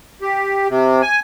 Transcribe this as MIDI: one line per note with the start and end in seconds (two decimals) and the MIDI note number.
0.22 0.67 67
0.69 1.02 48
1.02 1.20 80